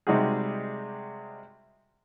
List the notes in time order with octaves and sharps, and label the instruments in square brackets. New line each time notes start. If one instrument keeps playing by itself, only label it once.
[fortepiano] C3 G3 G#3 D#4 F#4 G#4